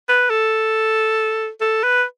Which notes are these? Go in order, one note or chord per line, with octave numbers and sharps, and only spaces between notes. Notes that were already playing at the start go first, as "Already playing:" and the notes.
B4
A4
A4
B4